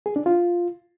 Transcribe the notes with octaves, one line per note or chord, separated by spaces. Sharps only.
G#4
D4
F4